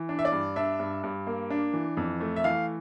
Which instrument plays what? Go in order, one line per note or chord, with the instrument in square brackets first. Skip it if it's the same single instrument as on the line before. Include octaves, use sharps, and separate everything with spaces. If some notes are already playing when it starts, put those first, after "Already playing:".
Already playing: [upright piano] E3
D4
E5
D5
G2
D4 E5
G2
G2
A#3
D4
E3
F2
A3
E5
E3 F5